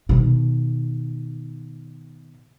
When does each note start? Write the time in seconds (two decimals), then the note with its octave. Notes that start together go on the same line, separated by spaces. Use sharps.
0.09 B2 D#3